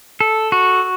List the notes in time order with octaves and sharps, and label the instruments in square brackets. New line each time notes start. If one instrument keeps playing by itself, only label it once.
[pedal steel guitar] A4
F#4